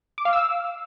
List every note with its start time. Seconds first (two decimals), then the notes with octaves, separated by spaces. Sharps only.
0.18 D6
0.25 F5
0.33 E6